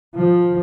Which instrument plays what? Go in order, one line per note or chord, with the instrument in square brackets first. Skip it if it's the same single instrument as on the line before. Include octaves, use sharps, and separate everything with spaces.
[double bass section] F3